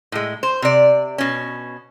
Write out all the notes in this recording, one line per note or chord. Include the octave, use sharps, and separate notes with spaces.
A2 G#3
C5
C3 D5
B2 C#4